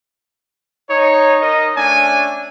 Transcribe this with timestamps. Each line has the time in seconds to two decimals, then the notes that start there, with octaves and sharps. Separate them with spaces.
0.90 D#4 C#5
1.41 D#4 A#4 D#5
1.76 A3 C#4 D4 G#5